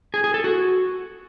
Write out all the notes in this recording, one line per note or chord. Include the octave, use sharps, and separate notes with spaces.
G#4
G#4
A4
F#4